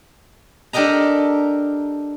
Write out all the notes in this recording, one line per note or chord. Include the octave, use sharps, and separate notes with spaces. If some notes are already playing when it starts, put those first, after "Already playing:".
D4 G4 A4 A#4 D#5 A#5